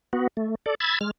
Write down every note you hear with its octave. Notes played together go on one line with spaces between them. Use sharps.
B3 F#4
A3
A4 D5
B5 E6 G#6 A6
G#3 F6